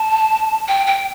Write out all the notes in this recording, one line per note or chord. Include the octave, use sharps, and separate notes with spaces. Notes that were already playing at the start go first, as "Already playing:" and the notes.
Already playing: A5
G5
G5